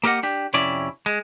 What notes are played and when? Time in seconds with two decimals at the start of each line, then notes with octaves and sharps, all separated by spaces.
0.04 A#3 G4 A#4 D#5 F#5
0.23 D4 G4
0.54 F2 C3 C#4 E4 D5
1.06 G#3